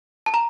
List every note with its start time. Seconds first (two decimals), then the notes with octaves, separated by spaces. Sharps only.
0.26 A5
0.34 A#5